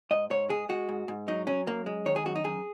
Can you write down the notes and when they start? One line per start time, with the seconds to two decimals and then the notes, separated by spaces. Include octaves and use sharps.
0.11 G#2 D#5
0.30 G#2 C#5
0.49 G#3 G#4
0.69 G#3 F#4
0.89 G#2
1.08 G#2
1.28 F#3 D#4
1.47 F#3 C#4
1.67 F#2 A#3
1.86 G#3
2.06 D#3 C#5
2.16 G#4
2.25 F#2 F#4
2.35 D#4
2.44 F#2 G#4